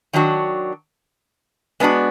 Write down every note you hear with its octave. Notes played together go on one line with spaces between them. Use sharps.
D#3 F#3 D4 F#4
G#3 B3 D4 F#4